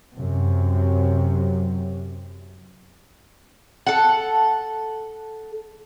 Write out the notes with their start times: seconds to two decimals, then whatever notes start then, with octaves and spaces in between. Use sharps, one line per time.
0.15 F#2 C3
3.86 A4 F#5